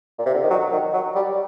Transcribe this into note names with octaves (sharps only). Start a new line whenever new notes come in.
A#2
C3
D3
D#3
F#3
D#3
F#3
G3